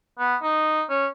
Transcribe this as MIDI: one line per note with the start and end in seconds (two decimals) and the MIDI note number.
0.18 0.36 59
0.42 0.83 63
0.90 1.07 61